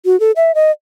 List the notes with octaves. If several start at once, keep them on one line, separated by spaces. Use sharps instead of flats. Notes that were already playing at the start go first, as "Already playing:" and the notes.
F#4
A4
E5
D#5